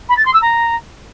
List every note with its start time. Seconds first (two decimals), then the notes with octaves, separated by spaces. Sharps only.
0.09 B5
0.17 A6
0.25 C6
0.33 E6
0.42 A#5